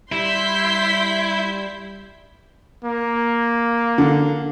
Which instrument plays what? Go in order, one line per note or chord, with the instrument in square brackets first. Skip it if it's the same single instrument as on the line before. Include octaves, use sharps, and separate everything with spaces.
[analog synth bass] G3 [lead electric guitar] E4 [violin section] C6 G6 B6
[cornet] A#3
[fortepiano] D3